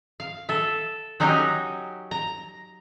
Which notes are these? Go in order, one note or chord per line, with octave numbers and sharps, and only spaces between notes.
F5
A4 E5
F#3 C#4 D#4 F#4 G4
A#5